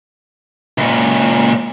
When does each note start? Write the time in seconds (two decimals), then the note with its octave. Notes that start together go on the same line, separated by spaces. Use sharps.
0.78 C#2 A#2